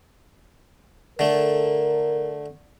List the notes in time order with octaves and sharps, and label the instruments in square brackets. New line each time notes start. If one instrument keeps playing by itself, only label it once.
[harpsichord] D3 A3 [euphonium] A#4